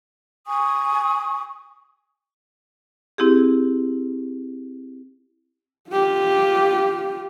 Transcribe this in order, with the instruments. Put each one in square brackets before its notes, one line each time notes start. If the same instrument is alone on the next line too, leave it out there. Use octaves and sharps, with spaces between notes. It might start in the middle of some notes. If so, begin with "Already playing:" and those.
[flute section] G#5 C#6 D#6
[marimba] C4 E4 G4 G#4
[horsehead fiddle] F4 G4